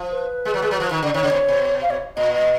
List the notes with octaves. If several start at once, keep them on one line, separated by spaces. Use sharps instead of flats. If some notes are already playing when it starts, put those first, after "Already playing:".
Already playing: F3
B4
G#3
F#3
G#3
F#3
F3
D#3
C#3
D#3 C#5
C#3
B2
B2
F5
C#5
A#2 D#5
D#5